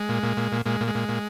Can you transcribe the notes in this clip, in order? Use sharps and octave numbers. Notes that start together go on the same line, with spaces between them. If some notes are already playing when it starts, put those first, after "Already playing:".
Already playing: G#3
A#2
A#2
A#2
A#2
A#2 G#3
A#2
G#3
A#2
A#2